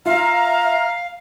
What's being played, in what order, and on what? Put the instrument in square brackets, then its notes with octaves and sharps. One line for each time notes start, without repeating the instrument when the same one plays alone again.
[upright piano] F4 [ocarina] E5 [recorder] F5 [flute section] A#5 F6